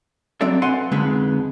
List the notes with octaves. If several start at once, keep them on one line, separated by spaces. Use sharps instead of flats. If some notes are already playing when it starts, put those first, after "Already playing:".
F#3 C4 D4 A4 D5 E5
B4 F5 F#5 G#5 C6
F2 G#2 D3 G#3 B3